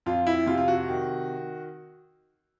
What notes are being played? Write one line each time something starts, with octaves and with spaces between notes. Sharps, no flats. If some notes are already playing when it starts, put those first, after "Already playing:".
F2 F4
E4
C3 F4
F4
F#4
D#3